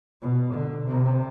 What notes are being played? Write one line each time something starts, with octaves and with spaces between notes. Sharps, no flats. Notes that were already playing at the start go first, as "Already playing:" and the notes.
B2
D3
C3